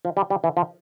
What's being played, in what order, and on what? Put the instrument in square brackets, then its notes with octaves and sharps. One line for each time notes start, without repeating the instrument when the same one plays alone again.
[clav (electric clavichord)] F3
G3
G3
E3
F3